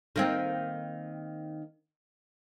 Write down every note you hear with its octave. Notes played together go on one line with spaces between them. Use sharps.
D#3 A#3 C4